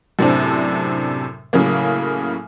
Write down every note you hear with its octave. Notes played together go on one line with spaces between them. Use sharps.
F#2 A2 C3 C4 D4
A2 C#3 F#3 A#3